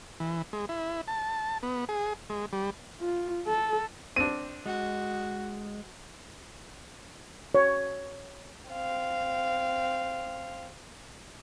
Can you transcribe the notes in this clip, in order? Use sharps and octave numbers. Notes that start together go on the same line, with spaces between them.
E3
G#3
E4
A5
B3
G#4
G#3
G3
F4
A4
C4 D4 D#7
G#3 F#4
C#5
C4 F5